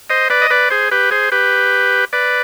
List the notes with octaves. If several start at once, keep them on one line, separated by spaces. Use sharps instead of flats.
C5 D#5
B4 D5
D#5
B4 D5
G#4 C5
G4 B4
G#4 C5
G4 B4
B4 D5